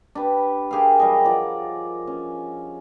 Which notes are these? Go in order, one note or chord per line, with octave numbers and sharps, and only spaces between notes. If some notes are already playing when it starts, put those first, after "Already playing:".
D4 G4 B4
G4 G#4 A#4 F5
F#3 G3 D#5
F3 D5
C#4